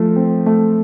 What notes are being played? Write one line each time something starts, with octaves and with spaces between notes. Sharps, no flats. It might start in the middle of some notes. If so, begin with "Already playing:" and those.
Already playing: F3 A3
C4
A3